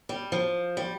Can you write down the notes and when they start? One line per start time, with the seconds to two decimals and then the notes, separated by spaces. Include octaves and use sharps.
0.09 G3
0.32 F3
0.77 G3